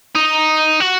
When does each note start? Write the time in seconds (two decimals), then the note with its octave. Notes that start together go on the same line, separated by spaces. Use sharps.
0.15 D#4
0.80 F#4